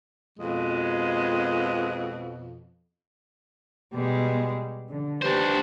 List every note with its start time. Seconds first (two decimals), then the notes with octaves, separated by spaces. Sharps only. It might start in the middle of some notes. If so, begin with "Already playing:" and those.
0.38 F2 B2 G#3
3.94 B2 G3 G#3
4.88 D3
5.22 D4 G4 B4 C5